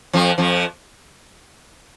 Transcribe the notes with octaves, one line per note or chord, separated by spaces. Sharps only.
F2 F3
F2 F3